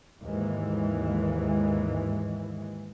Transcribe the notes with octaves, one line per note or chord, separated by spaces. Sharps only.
D#2 G#2 E3 G#3